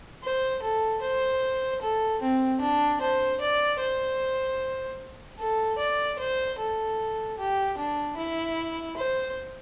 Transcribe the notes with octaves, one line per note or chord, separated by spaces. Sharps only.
C5
A4
C5
A4
C4
D4
C5
D5
C5
A4
D5
C5
A4
G4
D4
E4
C5